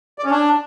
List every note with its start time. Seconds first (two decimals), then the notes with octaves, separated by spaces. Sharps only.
0.18 D5
0.25 C#4
0.31 D4